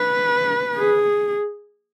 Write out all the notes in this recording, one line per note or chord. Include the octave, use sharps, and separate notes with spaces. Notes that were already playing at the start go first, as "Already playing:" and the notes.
Already playing: B4
G#4